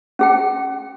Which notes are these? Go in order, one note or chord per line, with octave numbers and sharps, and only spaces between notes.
C#4 G#4 G5